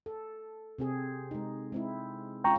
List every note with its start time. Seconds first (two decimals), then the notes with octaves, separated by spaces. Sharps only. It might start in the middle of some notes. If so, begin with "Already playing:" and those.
0.06 A4
0.78 C3 C4 G#4
1.31 G#3 D#4
1.72 G#3 C4 E4
2.44 G#3 C#4 F4 G5 A#5 C#6